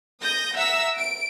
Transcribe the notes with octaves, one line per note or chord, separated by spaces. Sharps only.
D#6 G6 A#6
E5 F#5 A#5 E6
D7